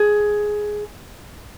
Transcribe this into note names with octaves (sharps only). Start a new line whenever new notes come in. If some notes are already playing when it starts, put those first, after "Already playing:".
Already playing: G#4